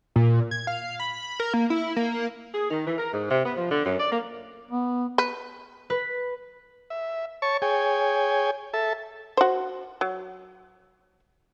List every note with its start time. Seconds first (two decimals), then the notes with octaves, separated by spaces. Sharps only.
0.16 A#2
0.51 G#6
0.67 F5
1.00 B5
1.40 A#4
1.54 A#3
1.70 E4
1.96 A#3
2.54 G#4
2.71 D#3
2.86 E3
2.98 A#4
3.13 G#2
3.31 C3
3.45 B3
3.57 F3
3.71 D3
3.86 F#2
3.99 D5
4.12 A#3
4.71 B3
5.18 B4
5.90 B4
6.90 E5
7.42 C#5 A5 C#6
7.62 G#4 C#5 G5 G#5
8.74 A4 E5 A5
9.37 F#4 C5
10.01 F#3